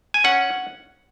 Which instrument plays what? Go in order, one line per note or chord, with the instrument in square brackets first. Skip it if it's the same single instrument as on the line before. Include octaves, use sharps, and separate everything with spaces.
[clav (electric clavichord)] G#5
C#4 F#5